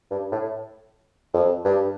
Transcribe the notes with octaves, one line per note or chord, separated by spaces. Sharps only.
G2
A2
F2
G2